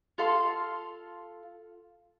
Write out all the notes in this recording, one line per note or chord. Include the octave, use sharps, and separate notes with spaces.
F4 A4 F5 C6